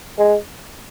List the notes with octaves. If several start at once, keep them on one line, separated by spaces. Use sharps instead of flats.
G#3